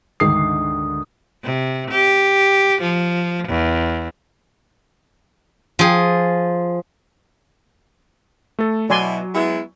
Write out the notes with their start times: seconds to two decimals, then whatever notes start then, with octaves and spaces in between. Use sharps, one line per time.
0.20 D2 G#2 D3 D#3 D#6 C7
1.44 C3
1.91 G4
2.82 F3
3.48 E2
5.79 F3 G#4
8.59 A3 A4
8.90 B2 F#3 E4 D5 G#5 C6
9.35 G#3 B3 E4